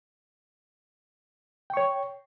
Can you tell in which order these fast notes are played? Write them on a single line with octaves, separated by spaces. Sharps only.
G5 C#6 C#5